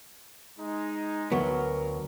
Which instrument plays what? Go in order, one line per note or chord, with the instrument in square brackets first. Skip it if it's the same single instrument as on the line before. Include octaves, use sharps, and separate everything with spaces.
[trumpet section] G#3 D#4
[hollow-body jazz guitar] D2 F#3 B3 [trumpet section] A#4